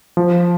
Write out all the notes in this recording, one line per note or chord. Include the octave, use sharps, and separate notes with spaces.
F3